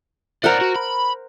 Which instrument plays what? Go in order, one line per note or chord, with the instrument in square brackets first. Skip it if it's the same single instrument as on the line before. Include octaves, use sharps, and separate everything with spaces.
[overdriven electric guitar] A2 D5 [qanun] A#4 C5 F#5
[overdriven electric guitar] F#4
B5